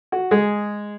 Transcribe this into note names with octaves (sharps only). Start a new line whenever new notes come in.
F#4
G#3 G#4